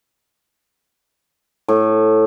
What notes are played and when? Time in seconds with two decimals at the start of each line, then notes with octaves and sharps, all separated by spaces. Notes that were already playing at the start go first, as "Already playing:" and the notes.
1.68 A2